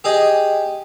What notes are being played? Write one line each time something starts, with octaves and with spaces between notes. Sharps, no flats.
G4 G#4 D#5